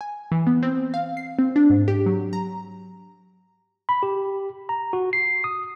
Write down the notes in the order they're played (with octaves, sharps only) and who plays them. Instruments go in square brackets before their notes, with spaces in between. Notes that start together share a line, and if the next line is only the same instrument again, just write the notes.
[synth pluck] G#5
E3
B3
C4
F5
C7
C4
D4
G#2
G4
F#3
A#5
[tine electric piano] B5
G4
A#5
F#4
C7
D#6